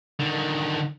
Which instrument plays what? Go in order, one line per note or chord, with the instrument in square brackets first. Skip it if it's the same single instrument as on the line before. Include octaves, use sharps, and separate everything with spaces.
[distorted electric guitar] D3 D#3